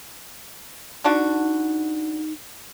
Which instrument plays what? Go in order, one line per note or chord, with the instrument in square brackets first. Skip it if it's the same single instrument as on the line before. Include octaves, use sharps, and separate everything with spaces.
[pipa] D3 D4 F#4 [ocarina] D#4